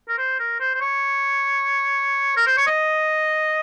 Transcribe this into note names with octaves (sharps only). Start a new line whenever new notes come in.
A#4
C5
A#4
C5
C5
C#5
A#4
C5
C#5
D#5